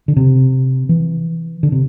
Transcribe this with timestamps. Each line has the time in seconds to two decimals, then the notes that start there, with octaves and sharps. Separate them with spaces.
0.08 D3
0.17 C3
0.89 E3
1.63 D3
1.72 C3